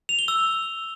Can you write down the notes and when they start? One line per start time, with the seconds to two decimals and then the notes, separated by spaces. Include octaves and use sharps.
0.09 F7
0.19 G7
0.28 E6